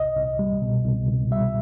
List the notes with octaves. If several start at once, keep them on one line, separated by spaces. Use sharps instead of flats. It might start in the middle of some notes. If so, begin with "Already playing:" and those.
Already playing: C2 D#5
C2
G3
B2
C2
C2
G3 E5